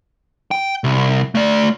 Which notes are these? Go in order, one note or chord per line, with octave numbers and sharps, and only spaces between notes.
G5
C2
A3 D5